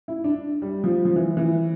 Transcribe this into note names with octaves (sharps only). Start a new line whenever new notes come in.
E4
D4
G3
F3
F3
E3
E3